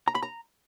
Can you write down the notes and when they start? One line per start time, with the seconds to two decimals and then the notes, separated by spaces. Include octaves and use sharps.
0.08 A#5
0.15 B5
0.23 A#5